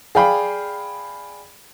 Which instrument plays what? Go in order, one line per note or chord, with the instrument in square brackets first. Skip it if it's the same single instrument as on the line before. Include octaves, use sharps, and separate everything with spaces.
[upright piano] G#4 D5 F5 G5 B5